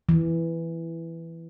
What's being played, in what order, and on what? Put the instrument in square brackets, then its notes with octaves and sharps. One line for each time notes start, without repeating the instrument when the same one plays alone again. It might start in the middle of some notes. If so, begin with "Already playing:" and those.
[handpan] E3